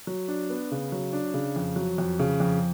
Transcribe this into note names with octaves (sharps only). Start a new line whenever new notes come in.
F#3
D4
B3
C#3
F#3
D4
C#3
F2
F#3
F2
C#3
F2